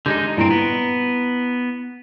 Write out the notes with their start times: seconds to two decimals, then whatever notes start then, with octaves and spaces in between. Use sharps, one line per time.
0.06 D3 G#3 D#4 G4 G6
0.37 G2 A#2 C4 E4 A#5 D7
0.50 B3